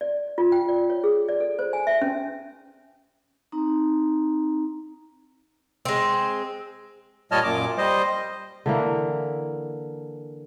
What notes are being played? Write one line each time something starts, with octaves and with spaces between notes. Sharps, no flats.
D5
F4
G5
D5
C#5
G#4
D5
A4
C5
G#5
E5
C#4
C4 D#4 A#5
G#3 C4
A#2 G3 C#5 D#5 A5 F6
F#2 A#2 D6
G3 C5 D#5
D3 E3 A#3